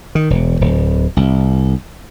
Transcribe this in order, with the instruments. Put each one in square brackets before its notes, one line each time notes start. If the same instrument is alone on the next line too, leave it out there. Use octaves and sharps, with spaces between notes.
[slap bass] D#3
E1
D1
C2